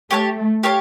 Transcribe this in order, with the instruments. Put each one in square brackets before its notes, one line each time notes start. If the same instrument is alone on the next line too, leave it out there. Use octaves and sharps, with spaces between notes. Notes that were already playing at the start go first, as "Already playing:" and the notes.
[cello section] A3 [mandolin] G4 C#5 F5 A5
[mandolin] G4 C#5 F5 A5